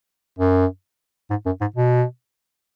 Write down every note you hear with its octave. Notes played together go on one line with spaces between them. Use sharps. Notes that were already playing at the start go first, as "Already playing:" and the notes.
F#2
G#2
F#2
G#2
B2